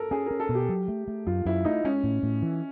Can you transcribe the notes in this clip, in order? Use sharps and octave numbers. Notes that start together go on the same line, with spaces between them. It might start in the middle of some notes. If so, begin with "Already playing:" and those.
Already playing: A4 A#4
C#4 G#4
C#4 A#4
A4
B2
G4
F#3
A3
A3
F#2 F4
F#2 E4
A3 D#4
G#3 C#4
A2
A2
E3